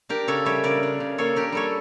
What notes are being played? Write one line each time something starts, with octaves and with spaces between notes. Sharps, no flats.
D4 G4 A#4
C#3 A4 C#5
G3 C#5 E5
C#3 A#4 D5
D4
C#3
A#3 A4 C#5
D4 G4 A#4
G3 A4 C#5